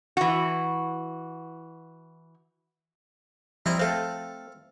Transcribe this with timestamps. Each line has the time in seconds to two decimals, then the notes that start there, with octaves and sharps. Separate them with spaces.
0.17 E3 F#4
3.66 F3 G3 C4 E4 D#5 A#5
3.79 A3 C4 A4 F5